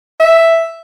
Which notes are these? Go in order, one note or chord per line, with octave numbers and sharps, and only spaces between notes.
E5